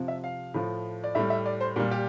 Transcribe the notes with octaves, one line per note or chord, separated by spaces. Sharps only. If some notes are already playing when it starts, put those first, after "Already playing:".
Already playing: C3 F3
E5
F5
A2 F3
D5
A2 G3 E5
E5
D5
C5
A#2 G3 A#4
G4